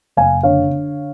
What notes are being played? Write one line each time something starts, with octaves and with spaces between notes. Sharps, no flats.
F#1 F5 G#5
D3 C#5 F5
D3